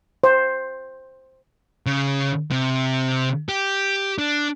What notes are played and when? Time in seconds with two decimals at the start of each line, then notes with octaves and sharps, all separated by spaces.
0.24 C5
1.86 C#3
2.51 C3
3.49 G4
4.19 D4